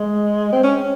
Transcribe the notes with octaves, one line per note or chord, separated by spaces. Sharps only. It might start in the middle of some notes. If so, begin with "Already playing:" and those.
Already playing: G#3
C4
C#4